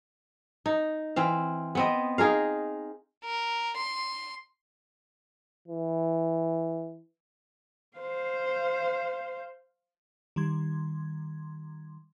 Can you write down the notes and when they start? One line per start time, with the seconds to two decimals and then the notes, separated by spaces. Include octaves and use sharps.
0.66 D#4
1.16 E3 C4 F5
1.75 B3 C4 D#5
2.18 D#4 G#4 A#4 F5
3.24 A#4
3.77 C6
5.68 E3
7.98 C5 F5
10.36 D#3 G3 C6 G#6